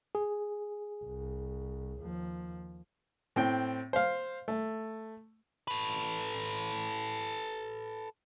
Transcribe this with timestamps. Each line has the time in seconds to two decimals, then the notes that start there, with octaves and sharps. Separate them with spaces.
0.15 G#4
1.04 C2
2.00 D#2 F3
3.36 A2 C4 G5
3.93 C5 F5
4.48 A3
5.68 A4 B4